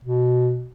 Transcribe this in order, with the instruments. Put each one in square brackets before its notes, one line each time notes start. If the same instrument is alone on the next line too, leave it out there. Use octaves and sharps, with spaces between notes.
[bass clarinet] B2